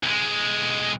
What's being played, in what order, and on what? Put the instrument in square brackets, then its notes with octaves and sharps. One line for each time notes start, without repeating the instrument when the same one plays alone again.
[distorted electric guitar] B1 G#3